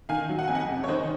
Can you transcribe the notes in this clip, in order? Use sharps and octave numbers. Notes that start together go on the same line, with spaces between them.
D#3 F5 G#5
F#3
F#5
F2 G#5
D#5 F#5
C3
C#5
D#3 C5 D#5